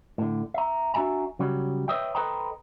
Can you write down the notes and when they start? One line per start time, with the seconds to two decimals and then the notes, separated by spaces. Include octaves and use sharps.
0.18 A2 D3
0.54 E5 A#5
0.94 D4 F#4 E5 G#5 A#5
1.39 C#3 F#3 G3
1.88 B4 C#5 D#5 E5 G5
2.15 A4 B4 C5 D#5 G5 A#5